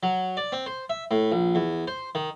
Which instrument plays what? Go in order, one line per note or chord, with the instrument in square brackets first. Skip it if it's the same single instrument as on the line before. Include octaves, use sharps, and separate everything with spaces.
[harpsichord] F#3
D5
C4
C5
E5
A2
A#1
E2
C5
D#3